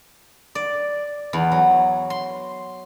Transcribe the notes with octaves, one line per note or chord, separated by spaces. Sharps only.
D5
E2
F#3
C6